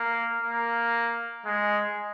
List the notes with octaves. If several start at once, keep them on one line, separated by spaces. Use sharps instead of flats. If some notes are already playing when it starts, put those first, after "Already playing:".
Already playing: A#3
A#3
G#3